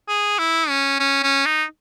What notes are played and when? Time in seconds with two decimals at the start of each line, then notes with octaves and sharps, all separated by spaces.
0.08 G#4
0.39 E4
0.69 C#4
1.00 C#4
1.23 C#4
1.46 D#4